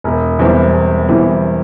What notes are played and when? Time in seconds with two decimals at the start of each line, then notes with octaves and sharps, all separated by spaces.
0.04 E1
0.39 E2 E3 G3 C4
0.74 E1
1.09 E2 E3 G3 C4